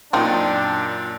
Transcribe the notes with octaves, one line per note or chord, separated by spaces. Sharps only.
F#2 A#2 C4 D4 D#4 G5